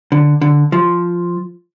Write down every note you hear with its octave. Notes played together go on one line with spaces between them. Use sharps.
D3
D3
F3